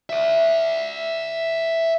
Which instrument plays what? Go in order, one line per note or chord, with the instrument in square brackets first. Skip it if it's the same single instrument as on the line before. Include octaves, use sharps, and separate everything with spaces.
[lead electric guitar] D5 E5